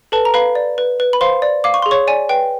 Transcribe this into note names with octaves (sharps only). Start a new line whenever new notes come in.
A4 B4 A5
A#5
B4 F5 B5
D5
B4
B4
B5
C5 F5 C6
D5
F5 D6
C#6
G#4 C6
C#5 C#6
D5 G#5
B4 G5